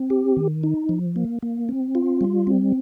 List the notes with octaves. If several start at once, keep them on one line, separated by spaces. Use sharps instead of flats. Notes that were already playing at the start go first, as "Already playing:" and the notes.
Already playing: C4
G4
D#3
D#4
F3
A#3
A#3
C4
F4
G3
C4